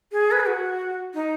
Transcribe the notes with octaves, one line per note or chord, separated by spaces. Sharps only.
G#4
B4
G#4
F#4
D#4